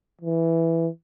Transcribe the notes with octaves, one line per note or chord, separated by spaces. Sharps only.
E3